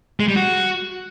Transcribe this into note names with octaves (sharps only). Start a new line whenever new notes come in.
G#3
G3
F#4